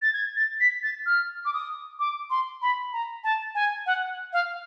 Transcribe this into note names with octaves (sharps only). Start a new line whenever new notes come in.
A6
G#6
A6
B6
A6
F6
D6
D#6
D6
C6
B5
A#5
A5
G#5
F#5
F5